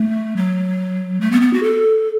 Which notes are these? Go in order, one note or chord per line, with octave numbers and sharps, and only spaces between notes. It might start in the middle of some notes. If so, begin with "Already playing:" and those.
Already playing: A3
F#3
A3
B3
B3
F#4
A4